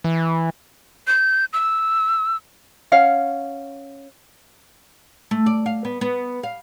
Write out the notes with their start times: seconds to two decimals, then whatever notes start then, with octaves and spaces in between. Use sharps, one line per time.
0.04 E3
1.07 G6
1.53 E6
2.92 C#4 F5 F#5
5.31 A3
5.46 D5
5.66 F5
5.85 B3
6.01 B3
6.43 F5